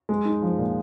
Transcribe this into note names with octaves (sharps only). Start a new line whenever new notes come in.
G#3
D#4
F3
A#2